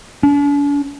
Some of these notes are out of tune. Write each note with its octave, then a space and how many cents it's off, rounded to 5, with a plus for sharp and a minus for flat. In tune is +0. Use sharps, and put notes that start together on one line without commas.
D4 -45